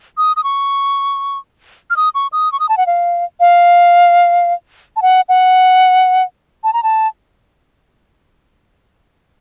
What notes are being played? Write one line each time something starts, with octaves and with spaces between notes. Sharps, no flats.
D#6
D#6
C#6
F6
D#6
C#6
D#6
C#6
D#6
A5
F#5
F5
F5
A5
F#5
F#5
A5
A#5
A5